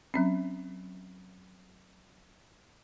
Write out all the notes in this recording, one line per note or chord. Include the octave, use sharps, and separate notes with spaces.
F#3 C4 C#4